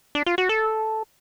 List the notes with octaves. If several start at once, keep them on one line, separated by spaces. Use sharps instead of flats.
D4
F4
F#4
A4